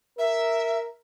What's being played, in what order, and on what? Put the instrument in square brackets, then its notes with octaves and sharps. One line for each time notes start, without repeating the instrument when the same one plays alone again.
[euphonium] A#4 [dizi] E5